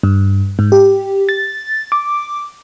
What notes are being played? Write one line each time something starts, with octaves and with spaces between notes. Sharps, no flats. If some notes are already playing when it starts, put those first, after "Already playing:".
G2
G#2
G4
A6
D6